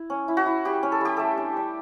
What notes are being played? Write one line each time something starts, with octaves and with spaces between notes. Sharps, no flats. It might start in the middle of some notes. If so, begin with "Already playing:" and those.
Already playing: E4
C#4
E4
F#4
E4
G3 G4
C#4
A4
G3 G4
A3 A4
D4
D4